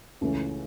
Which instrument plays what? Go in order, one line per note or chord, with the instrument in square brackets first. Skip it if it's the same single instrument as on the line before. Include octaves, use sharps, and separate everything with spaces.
[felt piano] C#2 C#3 E3 A3 C#4